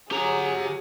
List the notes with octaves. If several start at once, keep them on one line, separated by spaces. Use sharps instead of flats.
F#3 G4 G#4 A#5